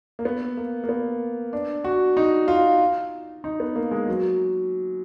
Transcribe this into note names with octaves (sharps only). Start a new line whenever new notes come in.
A#3
B3
A#3
A#3
B3
D4
F#4
D#4
F4
D#4
B3
A#3
G#3
F#3